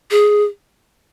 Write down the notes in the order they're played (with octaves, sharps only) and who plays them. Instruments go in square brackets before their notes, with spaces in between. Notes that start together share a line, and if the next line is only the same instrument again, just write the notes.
[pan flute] G#4